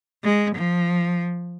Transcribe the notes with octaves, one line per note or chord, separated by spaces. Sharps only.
G#3
F3